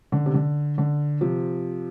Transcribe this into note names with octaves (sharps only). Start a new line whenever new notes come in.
D3
C3
D3
D3
C3 F3